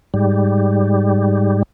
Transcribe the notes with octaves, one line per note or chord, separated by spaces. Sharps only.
G#2 G3